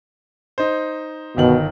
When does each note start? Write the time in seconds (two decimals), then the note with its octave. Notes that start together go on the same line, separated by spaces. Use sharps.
0.58 D#4 C5
1.37 G1 B2 D#3 F#7